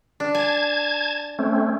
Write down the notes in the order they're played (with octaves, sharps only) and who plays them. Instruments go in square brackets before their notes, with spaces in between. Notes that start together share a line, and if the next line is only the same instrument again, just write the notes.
[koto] D4
[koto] G#5 [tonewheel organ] A5 G#6
[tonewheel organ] A3 C4 C#4